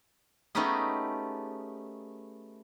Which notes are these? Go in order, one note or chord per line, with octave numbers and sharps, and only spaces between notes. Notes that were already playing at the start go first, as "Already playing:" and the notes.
A3 B3 C#4 D#4 G4 G#4